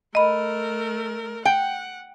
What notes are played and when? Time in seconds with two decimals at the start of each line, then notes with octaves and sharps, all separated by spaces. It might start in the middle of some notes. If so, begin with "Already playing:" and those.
0.15 A3 A#4 D#5 B5
1.45 F#5 G5